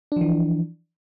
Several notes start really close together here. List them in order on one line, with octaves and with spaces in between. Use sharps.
D4 F3 E3